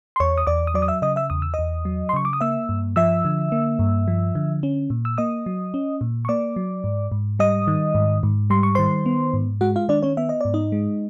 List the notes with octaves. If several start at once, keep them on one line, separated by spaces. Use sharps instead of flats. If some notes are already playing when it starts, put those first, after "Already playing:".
C6
E2 C#5 C#6
D#6
E2 D5 D6
D#6
F#3 D5 D6
D#6
E5 E6
C#3 D#5 D#6
E5 E6
E2 D#6
E6
E2 D#5 D#6
F#3
C6
C#3 C#6
D6
D#6
A#3 E5 E6
G2
F3 E5 E6
D3
A#3
G2
F3
D3
C#4
A#2
E6
A#3 D#5 D#6
F#3
C#4
A#2
C#6
A#3 D5 D6
F#3
G#2
G#2
G3 D#5 D#6
D#3
G#2
G#2
G3 C6
C#6
D#3 C5 C6
B3
G#2
G#3 F#4 F#5
F4 F5
D#3 D4 D5
C#4 C#5
B3 E5
D#5
G#2 D5
D#4 D#5
G#3